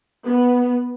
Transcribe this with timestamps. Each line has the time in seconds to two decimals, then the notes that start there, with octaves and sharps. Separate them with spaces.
0.24 B3